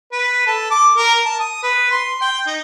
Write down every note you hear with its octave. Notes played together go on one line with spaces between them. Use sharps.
B4
A4
D6
A#4
A5
D#6
B4
C6
G5
D#4